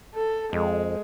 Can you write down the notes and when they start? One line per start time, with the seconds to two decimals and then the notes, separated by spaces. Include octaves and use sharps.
0.14 A4
0.53 F2 G#3